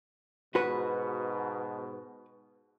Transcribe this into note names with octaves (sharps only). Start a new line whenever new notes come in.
G#2 B2 F#4 B4